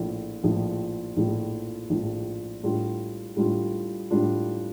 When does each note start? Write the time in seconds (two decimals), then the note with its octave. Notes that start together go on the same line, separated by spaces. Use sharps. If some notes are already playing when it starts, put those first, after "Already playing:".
Already playing: A#1 A2 F3
0.44 A#1 A2 F3
1.17 A#1 A2 F3
1.90 A#1 A2 F3
2.63 A2 G3 D4 F4
3.36 A2 G3 D4 F4
4.10 A2 G3 D4 F4